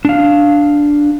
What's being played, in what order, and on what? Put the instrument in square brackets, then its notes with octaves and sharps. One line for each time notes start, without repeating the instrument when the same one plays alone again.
[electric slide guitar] D4 F5